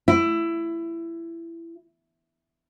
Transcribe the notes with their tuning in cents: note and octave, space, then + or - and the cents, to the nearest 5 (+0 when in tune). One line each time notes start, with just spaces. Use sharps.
E4 +20